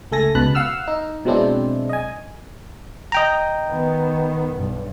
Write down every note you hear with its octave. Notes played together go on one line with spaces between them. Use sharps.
C#2 A3 A4 G#5 A#6
C#2 B2 A5 B5 F#6
F5 F#5 E6 F6
D#4
B2 F#3 G#3 C4 D4 E4
D#5 G#5
D#5 G5 A#5
D#3 B3
B1 G2